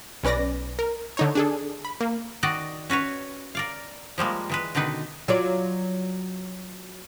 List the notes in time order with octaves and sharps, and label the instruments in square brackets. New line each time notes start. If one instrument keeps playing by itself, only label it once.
[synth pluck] B1 C#4 B4 D5 A#6
A#4
D3 D#4 C#5
D4 G#4 A4
B5
A#3
[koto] D#3 F#4 D5 D#5
C#4 F#4 B4 C#5
A#4 D5 F5
F3 G3 G#3 A#3
E3 G#3 B4
B2 D3 D#3 D#4 B4
[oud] F#3 F4 D5